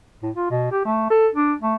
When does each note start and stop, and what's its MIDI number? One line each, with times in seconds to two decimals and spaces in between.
0.23 0.30 45
0.36 0.50 65
0.50 0.70 47
0.71 0.82 67
0.85 1.09 57
1.10 1.28 69
1.35 1.53 62
1.62 1.75 57